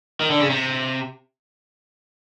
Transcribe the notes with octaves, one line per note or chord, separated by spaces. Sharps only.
D#3
D3
C#3
C3